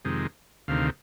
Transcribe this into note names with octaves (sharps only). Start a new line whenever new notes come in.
F2 C3 D#3 G#3
D2 C3 D#3 F5